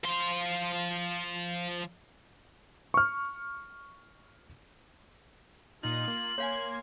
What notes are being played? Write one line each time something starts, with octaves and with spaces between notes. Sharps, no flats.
F3 C6
C#6 F6
A#2 D#4 F4 F#7
A#3
A#3 C#5 F5 G#5 C6 G#6